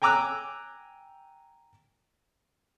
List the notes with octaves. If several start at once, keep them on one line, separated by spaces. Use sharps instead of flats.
G5 G#5 A#5 D6 E6 F#6